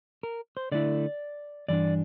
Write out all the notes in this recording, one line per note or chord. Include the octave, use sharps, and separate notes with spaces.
A#4
C5
D3 A3 E4 D5
G2 E3 D4 D5